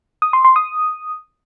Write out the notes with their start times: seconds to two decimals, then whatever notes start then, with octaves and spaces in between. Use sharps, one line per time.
0.22 D#6
0.33 C6
0.45 C6
0.56 D#6